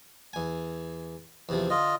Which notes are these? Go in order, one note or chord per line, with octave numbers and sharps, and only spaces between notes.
E2 G#5
E2 C3 F3
D3 F4 D#5